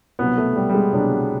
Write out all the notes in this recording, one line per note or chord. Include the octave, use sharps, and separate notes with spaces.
C2 B2 F#3 B3
A3
G3
G3
G#3
C2 B2 F#3 D4